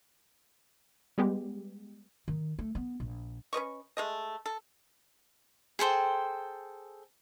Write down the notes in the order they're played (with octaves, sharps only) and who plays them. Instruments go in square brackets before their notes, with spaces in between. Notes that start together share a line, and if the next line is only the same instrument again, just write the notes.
[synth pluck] G3 G#3 B3 G4
[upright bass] D#3
A3
B3
A#1
[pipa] C#4 B4 D#5 C#6
G#3 A3 D#5
A4
[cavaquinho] G#4 A4 C5 G5